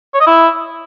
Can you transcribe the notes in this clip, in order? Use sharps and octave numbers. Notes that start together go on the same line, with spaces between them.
C#5
D#5
E4